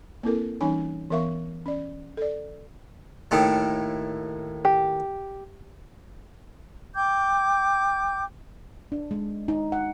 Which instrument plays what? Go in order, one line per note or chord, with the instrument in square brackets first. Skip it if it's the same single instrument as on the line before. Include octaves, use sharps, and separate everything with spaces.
[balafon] A#3 C4 E4 A4 A#4
E3 G3 C#4 D#4 C#5 G#5
E3 B3 A#4 E5 F5 C#6
C#4 D5
A4 D5
[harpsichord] D#2 A2 D#3
[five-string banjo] G4
[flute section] G5 D6 G6
[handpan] D4
G#3
D#4
F#5